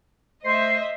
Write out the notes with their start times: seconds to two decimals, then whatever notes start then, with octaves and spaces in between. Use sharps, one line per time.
0.44 A3 C5 D#5 E5 C7